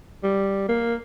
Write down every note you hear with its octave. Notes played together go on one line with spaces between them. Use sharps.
G3
A#3